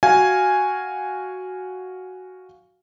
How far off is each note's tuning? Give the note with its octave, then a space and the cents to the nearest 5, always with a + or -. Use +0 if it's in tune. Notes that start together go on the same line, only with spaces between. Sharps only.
F#4 +0 F5 +0 G#5 +0